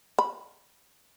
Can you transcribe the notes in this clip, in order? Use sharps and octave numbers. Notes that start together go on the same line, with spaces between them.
B5